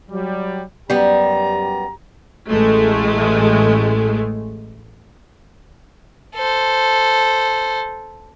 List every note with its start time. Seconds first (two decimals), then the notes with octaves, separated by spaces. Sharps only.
0.10 F#3 G3
0.90 F#2 G3 B3 G4 A#5
2.50 A1 G#3 A3
6.35 A4 C5